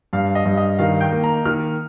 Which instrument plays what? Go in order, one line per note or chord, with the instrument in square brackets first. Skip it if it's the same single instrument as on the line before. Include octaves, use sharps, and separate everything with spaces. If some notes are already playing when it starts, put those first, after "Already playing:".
[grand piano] G2 [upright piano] F5
[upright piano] D#5
[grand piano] G2
[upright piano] D#5
[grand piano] D#3 [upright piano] F5
[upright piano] G5
[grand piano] A#3
[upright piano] A#5
[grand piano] D#3 [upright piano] F6